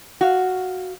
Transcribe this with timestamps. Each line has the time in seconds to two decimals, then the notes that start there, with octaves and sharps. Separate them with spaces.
0.21 F#4 F5